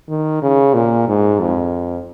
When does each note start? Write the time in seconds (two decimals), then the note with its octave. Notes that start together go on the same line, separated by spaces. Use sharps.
0.09 D#3
0.42 C#3
0.74 A#2
1.08 G#2
1.40 F2